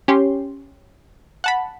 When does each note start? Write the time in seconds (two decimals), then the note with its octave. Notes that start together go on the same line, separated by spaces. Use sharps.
0.08 C#4 G4 C6
1.44 F#5 A5 B5